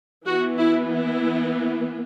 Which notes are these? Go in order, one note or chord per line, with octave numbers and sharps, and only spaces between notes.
E3 B3 F#4
E4
E4